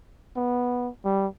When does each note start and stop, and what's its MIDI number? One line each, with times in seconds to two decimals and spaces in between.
0.36 0.90 59
1.04 1.27 55